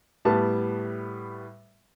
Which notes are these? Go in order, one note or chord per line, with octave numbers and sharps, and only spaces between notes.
A2 G3 B3 A5